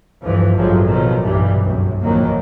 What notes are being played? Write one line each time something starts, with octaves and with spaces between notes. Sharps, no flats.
D2 G2 E3 F3
A1 G2 F3 F#3 G#3
B2 D#3 F3 F#3
B1 G2 A#2 E3 G3
C2 F#2 A2
A#1 F2 D#3 E3 F#3 A#3